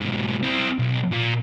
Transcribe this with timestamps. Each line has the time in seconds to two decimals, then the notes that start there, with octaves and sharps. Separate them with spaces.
0.01 G#2 B2
0.43 C4 E4
0.79 B1
1.12 A#2